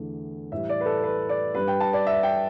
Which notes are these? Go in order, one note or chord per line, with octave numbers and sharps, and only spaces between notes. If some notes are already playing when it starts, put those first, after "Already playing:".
Already playing: E2 D3 A3
A2 E3 G3 E5
D5
B4
A4
B4
D5
G2 G3 B4
G5
A5
D5
E5
G5